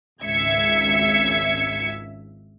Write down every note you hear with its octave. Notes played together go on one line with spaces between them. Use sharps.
G#1 C#2 E5 G#6 C#7